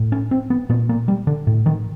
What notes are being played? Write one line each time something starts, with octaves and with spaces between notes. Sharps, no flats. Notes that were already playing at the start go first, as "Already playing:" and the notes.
Already playing: A2
C#4
C4
B3
A#2 B3
A#3
G3
D3
A2
D#3